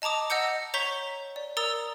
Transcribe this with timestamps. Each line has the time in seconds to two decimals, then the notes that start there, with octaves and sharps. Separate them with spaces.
0.02 D#5 A5 A#5 D6 D#6
0.30 D#5 F#5 E6 G6 C#7
0.74 C#5 A#5 C#6 G6 B6 G7
1.36 D5
1.57 A#4 A#5 D#6 E6 A6